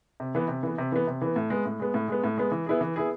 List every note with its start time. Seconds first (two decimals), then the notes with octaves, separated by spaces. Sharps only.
0.20 C3
0.35 E3 B3
0.48 C3
0.63 E3 B3
0.78 C3
0.92 E3 B3
1.08 C3
1.22 E3 B3
1.36 A2
1.50 G#3 B3
1.65 A2
1.80 G#3 B3
1.94 A2
2.08 G#3 B3
2.24 A2
2.37 G#3 B3
2.52 E3
2.66 B3 E4 G#4
2.81 E3
2.96 B3 E4 G#4